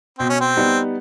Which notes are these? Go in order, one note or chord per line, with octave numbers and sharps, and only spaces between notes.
B2 C4
C#4
C4
G3 B3 D#4